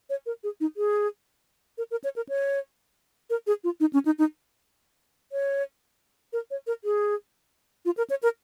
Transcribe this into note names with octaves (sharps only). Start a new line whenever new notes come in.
C#5
A#4
G#4
D#4
G#4
A#4
A#4
C#5
A#4
C#5
A#4
G#4
F4
D#4
C#4
D#4
D#4
C#5
A#4
C#5
A#4
G#4
F4
A#4
C#5
A#4